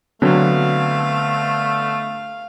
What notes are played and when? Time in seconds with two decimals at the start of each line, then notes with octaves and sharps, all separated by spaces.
0.22 D3 F#3 A3 B3 C4 F5